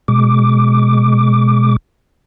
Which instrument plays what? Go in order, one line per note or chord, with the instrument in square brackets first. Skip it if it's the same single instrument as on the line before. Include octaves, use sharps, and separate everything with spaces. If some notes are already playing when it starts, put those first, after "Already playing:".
[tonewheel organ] B2 G#3 D6